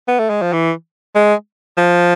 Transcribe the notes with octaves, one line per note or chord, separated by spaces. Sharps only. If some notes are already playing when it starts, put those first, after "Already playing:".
B3
A3
G#3
F3
E3
G#3
F3